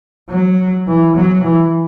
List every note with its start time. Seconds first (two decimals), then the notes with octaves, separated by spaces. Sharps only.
0.30 F#3
0.87 E3
1.15 F#3
1.44 E3